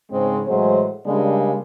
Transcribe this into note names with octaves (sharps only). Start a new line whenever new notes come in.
G#2 C#3 G#3 C4
A2 E3 F#3 G#3 C5
C#3 G3 G#3 A#3 D4